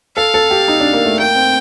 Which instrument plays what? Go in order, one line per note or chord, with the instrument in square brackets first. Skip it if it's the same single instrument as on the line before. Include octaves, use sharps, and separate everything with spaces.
[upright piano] A4 [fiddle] F5
[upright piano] A4
G4
D#4
D4
A#3
A3
[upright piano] A#3 [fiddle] G5
[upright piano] C4